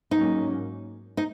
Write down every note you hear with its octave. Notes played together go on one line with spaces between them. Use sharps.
G#2 F#3 A#3 C#4 D#4
D#4